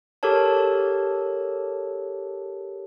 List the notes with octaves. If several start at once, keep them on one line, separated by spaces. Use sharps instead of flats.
G4 A4 A#4 C#5 A5